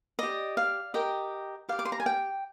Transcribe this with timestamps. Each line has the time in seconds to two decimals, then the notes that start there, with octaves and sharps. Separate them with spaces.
0.19 G4 D5 D#5
0.57 F5
0.94 G4 A#4 D#5 G5
1.69 G4 D5 F5
1.79 D6
1.85 C6
1.92 A#5
2.00 G#5
2.06 G5